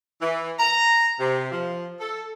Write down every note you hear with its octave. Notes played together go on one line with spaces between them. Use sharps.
E3
A#5
C3
F3
A4